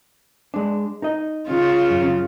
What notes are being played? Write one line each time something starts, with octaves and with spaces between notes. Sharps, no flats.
G#3 D4
D#4 D#5
C#3 F4
F#2